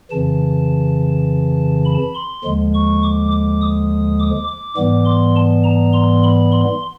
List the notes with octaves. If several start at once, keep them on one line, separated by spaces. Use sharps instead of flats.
F2 C#3 E3 A5
B5
C6
D#2 D3 F3 G#3
C#6
D6
D6
D#6
D6
D6
G#2 E3 G3 B3 D6
C6
A5
A#5
C6
B5
C6